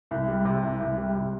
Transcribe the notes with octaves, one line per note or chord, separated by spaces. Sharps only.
C2
G3
C3
C2
C2
G3
C3